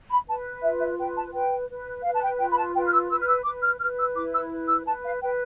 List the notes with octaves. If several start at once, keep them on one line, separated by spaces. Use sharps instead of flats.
B5
B4 A5
F4 E5
E5
B4 G5
A5
B4 G5
B4
B4 F5
A5
G5
F4 G5
B5
A5
B4 G5
F6
E6
B4 E6
F6
E6
B4 D6
F6
B4 F6
E6
E4 D6
E6
B4
E6
B4 A5
F5
B4 G5